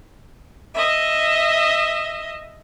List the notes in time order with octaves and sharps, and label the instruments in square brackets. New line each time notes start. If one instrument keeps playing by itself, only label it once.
[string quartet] D#5 E5